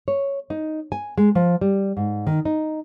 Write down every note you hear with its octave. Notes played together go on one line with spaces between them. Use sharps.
C#5
D#4
G#5
G#3
F3
G3
G#2
D#3
D#4